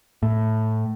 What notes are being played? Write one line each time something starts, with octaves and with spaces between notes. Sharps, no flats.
A2